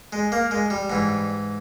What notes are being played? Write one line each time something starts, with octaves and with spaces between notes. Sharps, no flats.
G#3
A#3
G#3
G3
G#2 E3